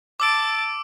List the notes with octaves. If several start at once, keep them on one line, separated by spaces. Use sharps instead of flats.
A5 D6 E6 A6 D7